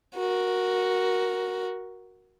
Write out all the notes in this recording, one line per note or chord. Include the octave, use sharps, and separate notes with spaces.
F#4 A#4